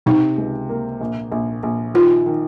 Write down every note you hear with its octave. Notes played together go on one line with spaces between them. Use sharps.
C3 D#4
C#2
A#3
A#1
A#1
A#1
D#3 F4
D#3